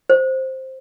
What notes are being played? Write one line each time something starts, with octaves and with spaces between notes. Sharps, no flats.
C5